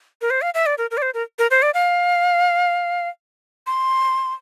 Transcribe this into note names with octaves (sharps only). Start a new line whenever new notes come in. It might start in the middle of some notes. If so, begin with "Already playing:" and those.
A#4
C5
F5
E5
D5
A#4
A#4
D5
C5
A#4
A#4
C5
D5
F5
C6